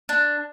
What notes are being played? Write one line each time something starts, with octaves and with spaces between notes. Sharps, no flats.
D4